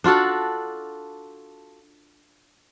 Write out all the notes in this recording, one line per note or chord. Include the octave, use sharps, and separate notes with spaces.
D4 F4 F#4 A4